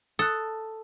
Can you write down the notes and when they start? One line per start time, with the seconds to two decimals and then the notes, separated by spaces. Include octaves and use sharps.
0.19 A4 D#6 F#6